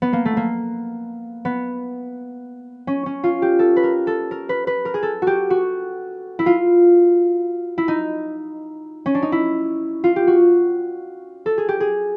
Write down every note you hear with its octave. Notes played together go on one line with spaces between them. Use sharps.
B3
A#3
A3
A#3
B3
C#4
C#4
F4
G4
A4
B4
A#4
A4
A#4
B4
B4
A#4
G#4
A4
F#4 G4
F#4
E4
F4
E4
D#4
C#4
D4
D#4
E4
F4
G4
F#4
A4
G#4
G4
G#4